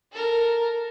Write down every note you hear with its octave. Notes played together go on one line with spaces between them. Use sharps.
A4 A#4